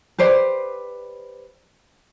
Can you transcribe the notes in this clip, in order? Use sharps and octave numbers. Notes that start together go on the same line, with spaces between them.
G4 B4 C5 D5